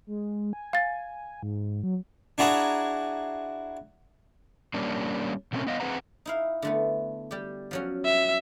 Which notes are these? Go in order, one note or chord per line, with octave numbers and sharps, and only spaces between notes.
G#3
G#5
F5 A6
G#2
F#3
D4 E4 F#4 G#4 A#5
G3 A#3 C#4 D4
B2 F3 A3 C4 C#4 A#4
B3 D#5 F5
C4 G#4 B4 F#5 A#5
D#4 E4 F5
D3 A3 B3
G3 G4
F3 F#3 C#4
E5